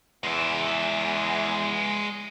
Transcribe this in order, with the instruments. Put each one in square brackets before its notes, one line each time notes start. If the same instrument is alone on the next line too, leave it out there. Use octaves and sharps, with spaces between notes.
[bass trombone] E2 [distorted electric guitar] G#3 E5